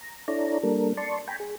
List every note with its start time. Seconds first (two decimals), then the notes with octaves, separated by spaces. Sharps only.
0.01 A#5
0.28 D4 E4 A4 C#5 D5 A#5
0.63 G3 A#3 D4 A4 A#4
0.97 D5 A5 C6 C#6
1.28 G5 G#5 A#5 B5
1.40 G#4